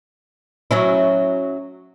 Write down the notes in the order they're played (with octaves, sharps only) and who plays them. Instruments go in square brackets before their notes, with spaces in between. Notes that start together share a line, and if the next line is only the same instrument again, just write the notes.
[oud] F#3 C#4 E4